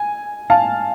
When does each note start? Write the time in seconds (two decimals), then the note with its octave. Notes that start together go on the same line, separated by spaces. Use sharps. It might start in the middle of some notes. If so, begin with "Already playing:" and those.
Already playing: G#5
0.50 F5 A5